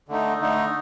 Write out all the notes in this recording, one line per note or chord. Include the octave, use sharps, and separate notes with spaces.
D3 A3 D#4
D3 A3 D#4